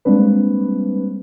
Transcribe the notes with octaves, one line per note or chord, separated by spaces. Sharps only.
G3 G#3 A#3 C4 D4 B4